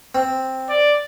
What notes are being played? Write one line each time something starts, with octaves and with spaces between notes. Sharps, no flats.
C4
D5